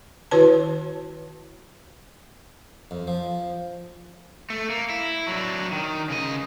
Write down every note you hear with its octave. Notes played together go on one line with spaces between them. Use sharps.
D#3 E4 F#4 B4 C#5 A5
F2
F3
A3
A#3
E4
F#3 D4
D#3
C#3 D#5